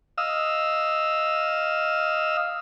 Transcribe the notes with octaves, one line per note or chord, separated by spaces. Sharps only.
D#5 F5 E6